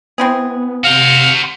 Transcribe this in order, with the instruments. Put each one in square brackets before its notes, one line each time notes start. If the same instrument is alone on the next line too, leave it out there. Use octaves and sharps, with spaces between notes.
[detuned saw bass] B3 [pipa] C4 E4 G#4
[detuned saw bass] C3 [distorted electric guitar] F#4 C5 [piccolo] F5